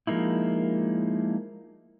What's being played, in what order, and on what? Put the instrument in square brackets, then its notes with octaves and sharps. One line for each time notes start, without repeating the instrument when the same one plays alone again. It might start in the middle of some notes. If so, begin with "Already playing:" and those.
[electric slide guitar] F3 G#3 A#3 D#4 E4